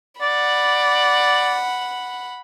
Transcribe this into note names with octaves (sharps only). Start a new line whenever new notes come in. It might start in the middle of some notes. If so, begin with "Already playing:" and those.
D5 F#5 B5